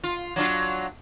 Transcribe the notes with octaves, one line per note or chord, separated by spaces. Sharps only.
F4
F#3 D4 F4